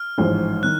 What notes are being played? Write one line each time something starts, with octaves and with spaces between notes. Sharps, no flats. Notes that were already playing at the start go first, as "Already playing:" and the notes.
Already playing: F6
A1 G#2 F3
D#3 F#6